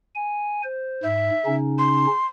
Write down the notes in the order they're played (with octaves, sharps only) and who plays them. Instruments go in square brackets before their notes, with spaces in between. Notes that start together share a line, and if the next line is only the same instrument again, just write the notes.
[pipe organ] G#5
C5
[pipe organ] G#2 [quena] E5
[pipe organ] C#3 C#4 D#4
[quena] C6